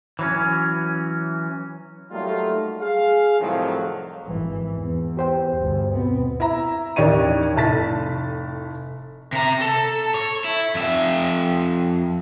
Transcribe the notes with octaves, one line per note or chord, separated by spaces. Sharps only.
E3 F#3 C#4
F#3 G3 A3 A#3 D#4 F4
G#4 F5
C2 F2 A2 D#3 F3 F#3
G#1 E3
E2
G4 C5 G5
G1 D2
D#2 B2 B3 C4
E4 E5 A#5
A1 D#2 D4 G4 C#5 D#7
F1 A2 A5 A6 B6
C3 A#5
A4
C#5
E4
F2 E5